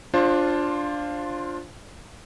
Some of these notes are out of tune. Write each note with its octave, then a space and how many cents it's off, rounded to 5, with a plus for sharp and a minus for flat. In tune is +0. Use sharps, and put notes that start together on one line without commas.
D4 +0 F4 +0 C5 +25